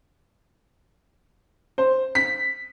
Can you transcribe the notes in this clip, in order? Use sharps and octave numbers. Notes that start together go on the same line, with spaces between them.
C5
B6